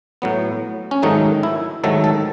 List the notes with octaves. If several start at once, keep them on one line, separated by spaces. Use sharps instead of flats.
A2 F#3 B3
C#4
G#2 D#3 F#3 A3 D#4
E4
G#2 D#3 F#3 A3 A4
A4